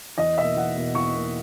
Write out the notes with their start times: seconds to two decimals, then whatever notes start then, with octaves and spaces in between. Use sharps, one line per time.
0.18 E2 D#5
0.38 B2 A#3 E5
0.56 E2 F#5
0.75 B2 A#3
0.95 E2 C#6
1.14 B2 A#3